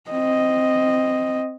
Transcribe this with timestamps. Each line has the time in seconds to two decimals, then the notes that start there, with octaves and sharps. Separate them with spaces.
0.10 C4 D#5